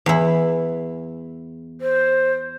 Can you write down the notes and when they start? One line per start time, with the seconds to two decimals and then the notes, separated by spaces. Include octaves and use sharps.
0.06 E2 E4
1.81 C5